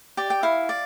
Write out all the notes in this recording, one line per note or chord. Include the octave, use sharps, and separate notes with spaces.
G4 D5
G5
E4 F5
D5